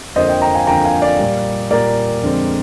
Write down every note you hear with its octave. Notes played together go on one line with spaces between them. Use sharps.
F2 D3 F3 A#3 C5 D#5
D#5 G5
G5 A#5
F5 G#5
F2 D3 F3 A#3 G5 A#5
F5 G#5
D5 F5
A#2 G3 A#3
A#2 G3 A#3 A#4 D5
F2 D3 G#3 C4